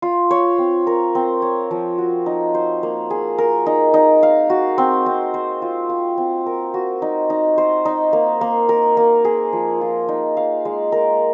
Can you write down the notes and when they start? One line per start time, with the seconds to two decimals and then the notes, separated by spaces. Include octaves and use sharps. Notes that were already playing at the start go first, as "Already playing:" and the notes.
0.02 F4
0.31 C#5
0.58 C4
0.87 A#4
1.15 C4
1.42 C#5
1.71 F3
1.98 F#4
2.26 D#4
2.54 C5
2.83 A#3
3.10 G#4
3.38 A#4
3.66 D#4
3.94 D#4
4.23 F5
4.50 F#4
4.78 C4
5.06 C4
5.34 C5
5.62 F4
5.89 F5
6.17 C4
6.46 A#4
6.74 F#4
7.02 D#4
7.30 D#4
7.58 C5
7.85 D#4
8.13 A#3
8.41 A#3
8.69 A#4
8.97 A#3
9.25 G#4
9.53 F3
9.81 F4
10.08 D#4
10.37 F5
10.65 G#3
10.92 A#4